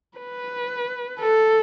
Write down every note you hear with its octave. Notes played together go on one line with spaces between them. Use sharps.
B4
A4